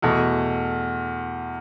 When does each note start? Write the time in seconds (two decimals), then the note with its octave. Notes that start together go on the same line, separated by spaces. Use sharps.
0.02 E2 B2 A3